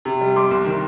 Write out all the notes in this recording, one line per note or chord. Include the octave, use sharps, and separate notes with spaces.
C3
G3
G3 C6 D6
C2
D#3